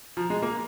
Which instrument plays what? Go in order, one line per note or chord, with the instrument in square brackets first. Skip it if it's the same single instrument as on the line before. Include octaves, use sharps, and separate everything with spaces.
[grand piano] F3 [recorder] A#5
[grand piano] G#3
A#3